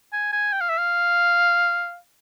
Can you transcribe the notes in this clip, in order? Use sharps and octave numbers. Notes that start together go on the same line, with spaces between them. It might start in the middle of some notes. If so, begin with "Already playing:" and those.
G#5
G#5
G5
F5
E5
F5